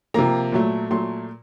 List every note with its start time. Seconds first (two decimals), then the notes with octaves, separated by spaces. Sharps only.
0.14 C3 F3 A#3 A#5
0.52 A#2 F#3 A3
0.90 A#2 F#3 A3 C6